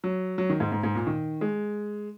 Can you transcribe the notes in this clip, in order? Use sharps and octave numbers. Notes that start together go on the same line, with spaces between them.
F#3
F#3
D#3
G#2
G#2
G#2
A#2
D#3
G#3